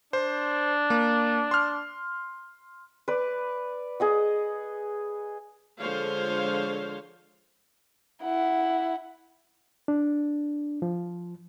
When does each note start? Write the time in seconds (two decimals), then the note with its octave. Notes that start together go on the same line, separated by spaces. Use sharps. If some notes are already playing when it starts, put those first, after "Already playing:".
0.13 D4 C5
0.90 A#3
1.51 C6 F6
3.08 B4 D5
4.00 G#4 D#5 F#5
5.78 D3 F3 G#3 C5 C#5 F5
8.23 E4 F#5
9.88 D4
10.82 F3